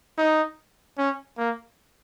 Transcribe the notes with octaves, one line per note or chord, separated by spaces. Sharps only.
D#4
C#4
A#3